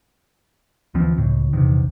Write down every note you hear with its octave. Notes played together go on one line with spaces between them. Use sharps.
D2 E3 F3 C4
C#2 A2
A#1 E2 C3 D#3